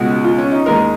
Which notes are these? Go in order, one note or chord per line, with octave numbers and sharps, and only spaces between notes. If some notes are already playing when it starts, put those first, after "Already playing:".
Already playing: C#2 B2 G#3 F#4
F4
C#4
D#4
D#2 D#3 G#3 A#4